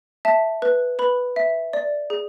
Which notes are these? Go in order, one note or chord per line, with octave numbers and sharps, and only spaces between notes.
E5 A5
B4
B4 B5
E5
D5
G#4